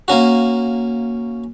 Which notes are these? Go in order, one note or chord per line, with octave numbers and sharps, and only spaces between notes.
A#3 C#4 F#4